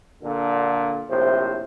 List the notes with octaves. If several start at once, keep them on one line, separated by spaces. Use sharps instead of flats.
A#2 D3
A#1 A2 C3 C5